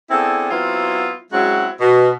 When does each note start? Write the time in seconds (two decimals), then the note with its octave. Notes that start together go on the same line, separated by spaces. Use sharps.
0.11 B3 C4 D4 E4 G#4 A4
0.51 F#3 B3 C4 E4 F4
1.33 F#3 G#3 C4 C#4 E4 F#4
1.81 B2